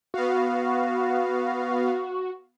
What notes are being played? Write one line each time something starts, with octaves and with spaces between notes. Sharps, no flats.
B3 F#4 F5